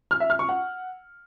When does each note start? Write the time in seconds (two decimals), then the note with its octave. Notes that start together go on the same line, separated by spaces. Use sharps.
0.11 F6
0.20 E5
0.30 F6
0.39 C#6
0.49 F#5